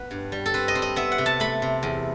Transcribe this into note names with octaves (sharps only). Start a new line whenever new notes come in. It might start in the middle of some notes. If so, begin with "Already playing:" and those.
Already playing: B3 B4
G2
G3
A4
C4 B4
D#5
C4
D#5
B3 E5
F#5
C3
A5
A3 B5
C3
E2